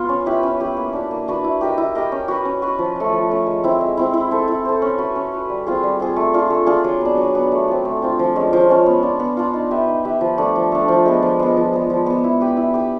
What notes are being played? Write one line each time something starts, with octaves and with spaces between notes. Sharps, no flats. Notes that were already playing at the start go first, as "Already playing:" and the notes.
Already playing: B3 F4
C#4
E4 G4 B4
C#4
E4 G4 B4
A#3
D4 F#4 B4
A#3
D4 F#4 B4
E4
G4 A#4 D#5
E4
G4 A#4 D#5
C#4
F#4 B4
C#4
F#4 B4
F3
A3 C#4
F3
A3 C#4
G#3
C4 E4
G#3
C4 E4
E4
A4 C5
E4
A4 C5
C#4
F#4 B4
C#4
F#4 B4
G3
C4 F4 G#4
G3
C4 F4 G#4
A3
D4 F4 G#4
A3
D4 F4 G#4
F#3
B3 D4
F#3
B3 D4
A3
C4 F4
A3
C4 F4
F3
G#3 C#4
F3
G#3 C#4
B3
D4 F4
B3
D4 F4
D#4
G4 B4 E5
D#4
G4 B4 E5
F3
A3 D4
F3
A3 D4
F3
G#3 B3
F3
G#3 B3
F3
G#3 B3
F3
G#3 B3
E4
G4 B4
E4
G4 B4